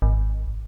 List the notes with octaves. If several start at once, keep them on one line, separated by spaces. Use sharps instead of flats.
G#1